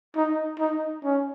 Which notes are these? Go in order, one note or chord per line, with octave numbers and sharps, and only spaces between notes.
D#4
D#4
C#4